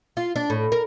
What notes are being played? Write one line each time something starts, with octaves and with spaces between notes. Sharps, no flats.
F4
D4
A2
A#4